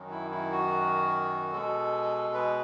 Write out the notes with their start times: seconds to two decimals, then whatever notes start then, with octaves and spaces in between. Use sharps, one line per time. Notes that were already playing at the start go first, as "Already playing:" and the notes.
Already playing: F#2 D#3 F#3
0.11 E4
0.31 E4
0.51 F#4
1.52 B2 G#3 A4
2.34 B4